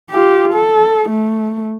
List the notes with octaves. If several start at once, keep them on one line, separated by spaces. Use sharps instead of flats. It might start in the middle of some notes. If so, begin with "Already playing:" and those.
F4 G4
A4
A3